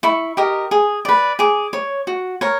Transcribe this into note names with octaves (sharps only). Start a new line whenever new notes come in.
E4 C#6
G4 A#4 D#5
G#4
B4 D5
G#4 D6
C#5
F#4
A#4 C#5